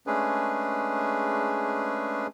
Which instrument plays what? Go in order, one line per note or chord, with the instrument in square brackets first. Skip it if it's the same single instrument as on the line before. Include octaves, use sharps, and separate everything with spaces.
[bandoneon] G#3 A3 C#4 D4 G#4 B4